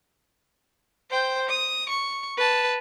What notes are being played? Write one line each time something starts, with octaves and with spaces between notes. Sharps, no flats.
C5 G5
D#6
C#6
B4 A5